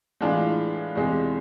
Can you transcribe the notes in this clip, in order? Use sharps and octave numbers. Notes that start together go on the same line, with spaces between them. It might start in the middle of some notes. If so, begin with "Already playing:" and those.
A2 E3 G#3 D4 F4
E2 C3 G#3